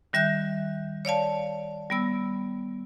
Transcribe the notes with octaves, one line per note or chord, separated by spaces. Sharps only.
D#3 G3 E5 F#6 G6
C#5 D5 F5 A5
G3 B3 E6